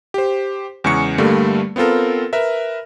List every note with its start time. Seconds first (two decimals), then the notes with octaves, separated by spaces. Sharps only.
0.14 G4 C5
0.84 E2 C#3 G#3 C#6 C#7
1.18 G2 D3 G3 A3 A#3
1.76 B3 C4 F4 A4 A#4
2.33 A#4 B4 E5